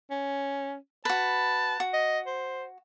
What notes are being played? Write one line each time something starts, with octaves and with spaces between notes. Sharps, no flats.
C#4
F#4 B4 A5
F#4
D#5
C5